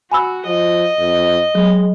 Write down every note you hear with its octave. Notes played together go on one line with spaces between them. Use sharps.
F#4 G#5 B5 E6
F3 D#5
F2
F#3 G#3